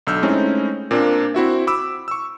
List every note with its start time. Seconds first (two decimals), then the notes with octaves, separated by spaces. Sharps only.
0.07 B1 D3 E6 F6 G6
0.23 G#3 A3 C4 C#4 D#4 E4
0.91 A#2 A#3 C4 D4
1.35 C4 E4 F#4 E5
1.67 B5 D6 E6
2.08 C#6 E6